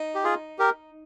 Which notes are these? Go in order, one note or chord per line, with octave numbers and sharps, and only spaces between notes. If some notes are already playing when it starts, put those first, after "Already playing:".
Already playing: D#4
G4
F4 G#4
G4 A#4